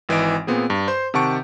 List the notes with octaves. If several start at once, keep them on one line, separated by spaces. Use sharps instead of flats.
G#1 E3 D#5 D7
A#2 B3 C4 G#4
G2
C5 C6 G6
C3 D#3 F#5 A5 C#6 D7